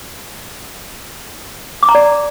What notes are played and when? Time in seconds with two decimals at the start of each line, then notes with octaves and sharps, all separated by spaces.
1.83 D6
1.89 A#5
1.95 D5